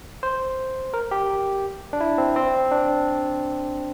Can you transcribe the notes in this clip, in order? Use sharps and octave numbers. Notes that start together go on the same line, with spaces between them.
C5
A#4
G4
D4
E4
C4
C4
D4